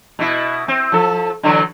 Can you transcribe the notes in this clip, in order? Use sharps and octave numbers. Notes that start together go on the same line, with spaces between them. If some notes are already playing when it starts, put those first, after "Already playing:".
B2 E4
C4
F3 A4
D3 E3 F#3